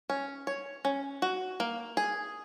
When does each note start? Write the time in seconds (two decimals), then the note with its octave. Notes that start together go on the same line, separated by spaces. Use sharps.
0.10 C#4
0.47 C#5
0.85 C#4
1.22 F#4
1.60 A#3
1.97 G#4